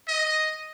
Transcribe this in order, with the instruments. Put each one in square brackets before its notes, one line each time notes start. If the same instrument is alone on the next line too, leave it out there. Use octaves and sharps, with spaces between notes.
[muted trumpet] D#5